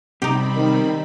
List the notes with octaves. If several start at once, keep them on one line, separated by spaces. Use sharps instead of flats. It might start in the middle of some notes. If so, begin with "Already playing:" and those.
C3 G3 C4 D#4 G4 B5
D#3